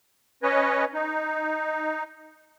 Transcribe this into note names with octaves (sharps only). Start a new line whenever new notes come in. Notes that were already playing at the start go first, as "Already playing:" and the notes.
C#4 B4 C#5 D#5
D#4